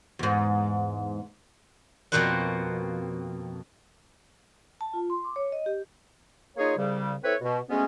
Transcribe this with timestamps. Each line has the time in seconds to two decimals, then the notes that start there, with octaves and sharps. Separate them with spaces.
0.19 E2 G#2
2.12 F2 B2 A#3 F#4 C5 F#5
4.81 A5
4.93 F4
5.10 C6
5.24 D6
5.36 C#5
5.52 D#5
5.66 G4
6.56 A#3 D#4 F4 G#4 C#5
6.76 C2 C#3 G3
7.22 C4 E4 A4 B4 C#5
7.40 B2
7.68 D2 G#3 A3 B3 C#4